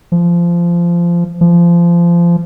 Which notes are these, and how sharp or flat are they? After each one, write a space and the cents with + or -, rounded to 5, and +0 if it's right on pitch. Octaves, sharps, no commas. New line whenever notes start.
F3 -20
F3 -25